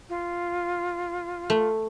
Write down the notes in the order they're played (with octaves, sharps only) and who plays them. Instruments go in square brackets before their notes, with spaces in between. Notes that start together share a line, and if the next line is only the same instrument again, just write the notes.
[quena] F4
[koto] A3